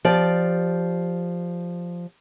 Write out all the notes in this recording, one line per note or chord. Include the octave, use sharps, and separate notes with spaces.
F3 G4 D5